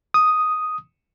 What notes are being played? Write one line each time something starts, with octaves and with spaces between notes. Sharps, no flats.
D#6